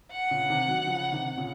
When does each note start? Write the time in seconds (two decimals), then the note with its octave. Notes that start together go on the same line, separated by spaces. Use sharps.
0.11 F#5
0.31 A#2 C#3
0.50 C3 D#3
0.68 D#3 F#3
0.87 C#3 F3
1.12 C3 D#3
1.38 A#2 C#3